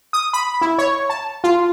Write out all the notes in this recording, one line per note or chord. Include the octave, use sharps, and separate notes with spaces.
D#6
B5
E4
C#5
A5
F4